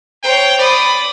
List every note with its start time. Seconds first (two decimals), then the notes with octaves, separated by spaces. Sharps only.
0.23 C5 C#5 G5
0.59 D5 B5 D#6